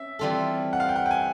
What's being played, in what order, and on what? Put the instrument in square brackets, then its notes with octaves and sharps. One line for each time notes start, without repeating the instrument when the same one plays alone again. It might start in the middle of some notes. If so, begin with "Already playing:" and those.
Already playing: [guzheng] C#4 [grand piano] E5
[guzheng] E3 G3 C4 F4 A4
[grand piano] F#5
F5
G5
F#5
G5
G#5